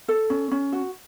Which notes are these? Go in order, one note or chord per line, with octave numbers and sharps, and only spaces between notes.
A4
C#4
C#4
F#4